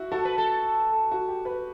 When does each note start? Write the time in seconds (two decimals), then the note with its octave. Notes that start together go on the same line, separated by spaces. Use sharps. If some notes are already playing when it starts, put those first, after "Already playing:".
Already playing: E4 F#4
0.12 F#4 A4
0.25 B4
0.38 A4
1.11 F#4
1.28 G4
1.45 B4